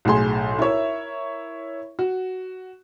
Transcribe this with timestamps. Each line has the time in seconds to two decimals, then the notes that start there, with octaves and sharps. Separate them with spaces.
0.05 B1 A2 G#4 C6
0.59 E4 A#4 C#5 E5
1.99 F#4